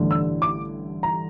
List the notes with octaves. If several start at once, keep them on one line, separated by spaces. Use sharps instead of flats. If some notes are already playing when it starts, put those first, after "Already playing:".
Already playing: A1 G2 D3 A3
E6
D6
A#5